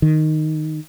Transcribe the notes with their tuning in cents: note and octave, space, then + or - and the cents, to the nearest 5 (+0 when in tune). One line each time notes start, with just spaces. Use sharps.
D#3 -5